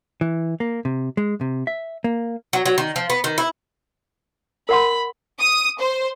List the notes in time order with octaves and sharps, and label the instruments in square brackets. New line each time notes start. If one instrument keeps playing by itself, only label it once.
[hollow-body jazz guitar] E3
A#3
C3
G#3
C3
E5
A#3
[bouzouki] F#3
F#3
D#3
F3
B3
D#3
E4
[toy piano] A#4 F#5 C6 [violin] B5
[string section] D#6
C5